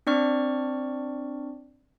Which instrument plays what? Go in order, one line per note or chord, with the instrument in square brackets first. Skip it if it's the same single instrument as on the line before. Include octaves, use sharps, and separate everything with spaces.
[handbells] C4 D4 D5 C#6 F6